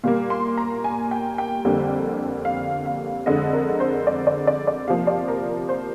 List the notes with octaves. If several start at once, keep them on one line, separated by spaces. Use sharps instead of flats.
A#2 G3 A#3 F5
C6
A#5
G#5
G5
G5
F2 D3 G3 A#3
F5
F5
F2 D3 G#3 D#5
A#4
C5
D5
D5
D5
D5
C3 F3 A#3 F5
D5
A#4
A#4
C5